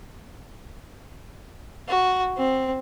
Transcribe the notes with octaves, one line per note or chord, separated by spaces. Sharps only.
F#4
C4